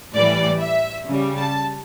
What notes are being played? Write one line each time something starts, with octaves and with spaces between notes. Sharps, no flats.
A2 E3 G3 D5
E5
C#3 G3
A5